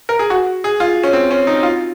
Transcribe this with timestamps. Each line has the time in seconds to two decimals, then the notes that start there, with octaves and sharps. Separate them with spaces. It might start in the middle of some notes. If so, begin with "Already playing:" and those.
0.09 A#4
0.19 G#4
0.30 F#4
0.64 G#4
0.80 F4
1.03 C#4
1.13 C4
1.31 C#4
1.47 D#4
1.63 F4